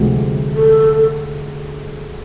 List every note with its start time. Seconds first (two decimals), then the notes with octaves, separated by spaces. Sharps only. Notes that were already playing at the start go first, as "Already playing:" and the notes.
Already playing: D2 C3 F3 G#3
0.56 A4